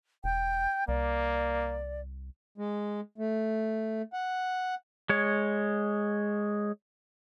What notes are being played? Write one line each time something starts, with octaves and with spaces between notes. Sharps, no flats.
E1 G5
C2 A#3 D5
G#3
A3
F#5
G#3 C#5